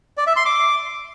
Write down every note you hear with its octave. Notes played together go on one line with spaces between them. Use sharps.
D5
E5
C6
D6